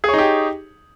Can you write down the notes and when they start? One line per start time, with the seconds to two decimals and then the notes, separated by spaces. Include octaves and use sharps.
0.04 G#4
0.09 C#5
0.14 D#4
0.18 G4